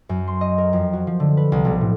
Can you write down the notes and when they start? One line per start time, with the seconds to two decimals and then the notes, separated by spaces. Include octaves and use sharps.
0.09 F#2
0.28 C6
0.41 D#5
0.58 A#4
0.73 F2
0.93 F#4
1.07 F3
1.20 D3
1.37 B4
1.52 C2
1.65 B1
1.81 A2